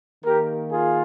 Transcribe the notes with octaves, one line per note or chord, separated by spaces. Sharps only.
D#3 A#3 G4 A#4
F4 G#4